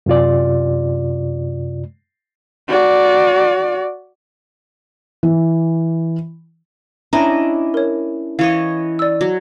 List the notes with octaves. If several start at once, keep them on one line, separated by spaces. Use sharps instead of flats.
F#2 C3 F4 D5
F#4 D5
E3
C#4 D4 E4 D#5 A#5 A#6
A#4 C#5
E3 C#5 D#5 F5
D5 E6
F#3